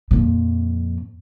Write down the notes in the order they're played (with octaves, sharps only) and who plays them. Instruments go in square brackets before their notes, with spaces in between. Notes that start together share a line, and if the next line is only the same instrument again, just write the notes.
[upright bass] F2 A#2